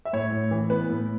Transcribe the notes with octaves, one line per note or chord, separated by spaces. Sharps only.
E5
A2 C#5
A2
E3
B3 B4
A2